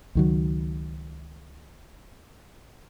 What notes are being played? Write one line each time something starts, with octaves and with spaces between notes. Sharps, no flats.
C#2 D#3 F#3